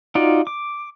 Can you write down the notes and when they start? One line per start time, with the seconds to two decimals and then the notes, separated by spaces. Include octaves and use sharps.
0.15 D#4 F4 F#4 D5
0.47 D6